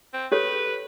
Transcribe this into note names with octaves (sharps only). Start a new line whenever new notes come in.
C4
G4 A4 B4 C#5